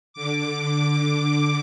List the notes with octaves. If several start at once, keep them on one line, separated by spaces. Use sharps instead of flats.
D3 D6